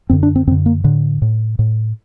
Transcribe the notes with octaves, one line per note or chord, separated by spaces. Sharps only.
F#2 D3 C4
D4
C4
F#2 D3 C4
A#3
A2 D3
A2
A2